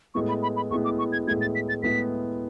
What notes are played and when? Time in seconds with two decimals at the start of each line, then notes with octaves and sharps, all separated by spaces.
0.14 A2 G#3 B3 E4 C#6
0.28 B5
0.43 B5
0.56 B5
0.70 A2 G#3 B3 E4 C#6
0.85 D6
0.99 C#6
1.12 G#6
1.27 A2 G#3 B3 E4 G#6
1.41 A6
1.55 B6
1.69 A6
1.83 A2 G#3 B3 E4 B6